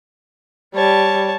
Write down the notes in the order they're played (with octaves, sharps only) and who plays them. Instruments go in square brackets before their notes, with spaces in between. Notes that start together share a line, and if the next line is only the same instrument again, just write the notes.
[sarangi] G3 [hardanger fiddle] C#5 A5